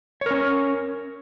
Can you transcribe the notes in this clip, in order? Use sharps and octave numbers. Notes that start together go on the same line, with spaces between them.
C#4 A#4 C#5